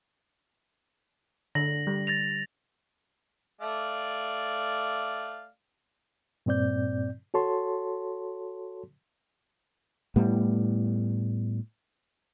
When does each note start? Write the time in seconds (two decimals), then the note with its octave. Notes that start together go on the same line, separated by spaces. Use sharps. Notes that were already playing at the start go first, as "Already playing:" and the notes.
1.55 D3 A#6 F#7
1.87 G3
2.07 A6 A#6 F7
3.61 A3 D5 F5
6.46 G2 A#2 C4 D5 G6
7.34 F#4 A4 C#5 A5 C6
10.16 A2 G3 B3